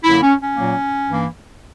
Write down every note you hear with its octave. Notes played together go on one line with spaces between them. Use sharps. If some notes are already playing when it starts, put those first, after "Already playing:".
F#2 D3 F#3 A#3 E4
C#4
C#4
A#2 F#3 A#3
G2 E3 A#3